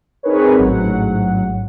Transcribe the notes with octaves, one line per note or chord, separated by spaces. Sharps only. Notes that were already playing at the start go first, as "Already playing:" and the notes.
C4 D#4 G#4 A#4 B4 C#5
A1 G#2 F#3 F#5